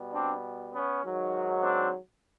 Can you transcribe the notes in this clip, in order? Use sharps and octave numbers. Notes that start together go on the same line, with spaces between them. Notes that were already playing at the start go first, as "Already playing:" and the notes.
Already playing: B2 G3
C4 D4
B3 C#4
G#2 D#3 F#3
C4 D4